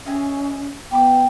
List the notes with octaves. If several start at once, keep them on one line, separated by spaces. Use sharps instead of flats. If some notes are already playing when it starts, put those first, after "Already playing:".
C#4 G#4 D#5 E5
B3 G4 B5 D6